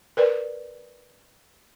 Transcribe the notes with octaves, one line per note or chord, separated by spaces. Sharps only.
A#4 B4 D5